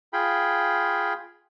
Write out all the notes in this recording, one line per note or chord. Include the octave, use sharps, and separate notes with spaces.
F4 G#4 G5 B5